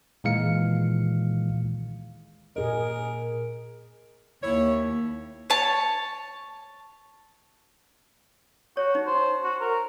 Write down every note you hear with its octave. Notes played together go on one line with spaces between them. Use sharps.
A#2 D#3 E3 G#3 F5 C#7
A#2 G#4 A#4 D#5
D#2 E4 C#5
C#5 A5
F#4 C#5
D#4
C5
F#4
A#4